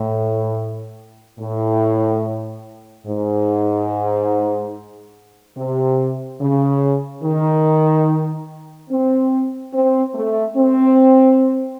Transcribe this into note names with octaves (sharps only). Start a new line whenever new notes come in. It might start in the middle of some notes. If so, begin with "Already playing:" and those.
Already playing: A2
A2
G#2
C3
C#3
D#3
C4
C4
A3
C4